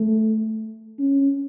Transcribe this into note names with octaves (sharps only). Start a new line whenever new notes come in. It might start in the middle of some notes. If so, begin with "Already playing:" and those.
Already playing: A3
C#4